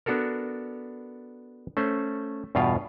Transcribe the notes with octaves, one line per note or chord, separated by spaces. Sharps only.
B3 D4 F#4 A4 A#4
A3 C#4 C5
E2 G2 B2 F4 F5